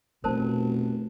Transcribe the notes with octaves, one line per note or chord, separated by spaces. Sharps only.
F1 B2 A3 A#4 C5 A5